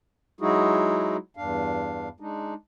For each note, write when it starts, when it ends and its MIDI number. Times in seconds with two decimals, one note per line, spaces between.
0.41 1.17 54
0.41 1.17 56
0.41 1.17 63
0.41 1.17 64
0.41 1.17 66
0.41 1.17 68
1.37 2.09 40
1.37 2.09 43
1.37 2.09 62
1.37 2.09 77
2.20 2.54 56
2.20 2.54 62
2.20 2.54 63